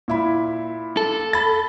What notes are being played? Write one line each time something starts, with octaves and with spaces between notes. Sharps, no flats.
A#2 E4 B5
A4
B5 A6